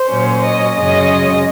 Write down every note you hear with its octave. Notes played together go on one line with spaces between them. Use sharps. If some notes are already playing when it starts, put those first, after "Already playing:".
Already playing: C5
A#2 F#3 C#4
D#5
F#2 C#3 G#3 C#4 D#5